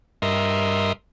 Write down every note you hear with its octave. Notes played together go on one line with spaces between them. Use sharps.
G2 A#4 D#5 E5 C6